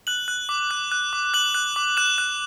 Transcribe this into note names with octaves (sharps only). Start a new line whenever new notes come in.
F#6 F#7
F#6
D6
F#6
F#6
D6
F#6 F#7
F#6
D6
F#6 E7
F#6